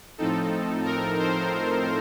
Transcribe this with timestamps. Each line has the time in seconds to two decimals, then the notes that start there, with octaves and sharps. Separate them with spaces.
0.18 A2 F3 C4 D#4 A4
0.85 A#4
1.19 C5